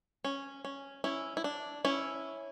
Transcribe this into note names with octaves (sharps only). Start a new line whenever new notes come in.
C#4
C#4
C#4 E4
E4
D4
C#4 E4